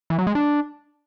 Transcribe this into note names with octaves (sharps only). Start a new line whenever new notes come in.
E3
F#3
G#3
D4